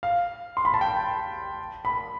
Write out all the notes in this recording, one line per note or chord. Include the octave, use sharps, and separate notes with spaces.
F5
C6
B5
A5
G5
B5